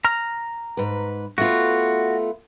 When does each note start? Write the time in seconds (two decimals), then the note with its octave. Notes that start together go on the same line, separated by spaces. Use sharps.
0.05 A#5 F6
0.77 G#2 B4
1.38 A3 B3 F4 F#4